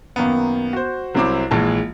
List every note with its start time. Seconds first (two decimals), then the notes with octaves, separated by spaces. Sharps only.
0.16 F#2 D#3 A#3 B3
0.73 F#4 C5
1.15 C2 F#3 C4 E4 D6
1.51 A#1 E3 G#3 A5